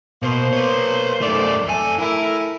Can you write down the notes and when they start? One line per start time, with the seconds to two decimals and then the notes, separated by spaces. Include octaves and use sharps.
0.22 B2 A#3 C5
0.53 B4 C#5
1.21 F#2 D#3 A3 D5
1.67 F2 A3 A4 G#5
2.00 A3 E4 A#4